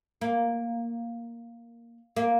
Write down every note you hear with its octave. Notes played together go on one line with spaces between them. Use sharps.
A#3
A#3